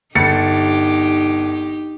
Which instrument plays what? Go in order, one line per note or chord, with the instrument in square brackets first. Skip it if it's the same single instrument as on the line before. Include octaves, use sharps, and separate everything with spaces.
[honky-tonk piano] G1 A6 C#7 [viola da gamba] D#4 G4